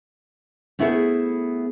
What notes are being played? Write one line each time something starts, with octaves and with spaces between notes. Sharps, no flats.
A3 B3 E4 G#4 A4 C5